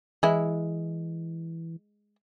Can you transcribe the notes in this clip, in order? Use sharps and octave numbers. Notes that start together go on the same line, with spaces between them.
E3 G#3 E4